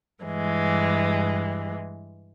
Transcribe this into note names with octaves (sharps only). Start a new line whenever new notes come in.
G2 E3 G#3